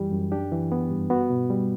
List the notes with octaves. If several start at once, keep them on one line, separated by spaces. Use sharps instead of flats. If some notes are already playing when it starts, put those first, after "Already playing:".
Already playing: F#2 E3 G3 G4
F#2
D4 G4
E3
B3
G2
B3 F#4
B2
G3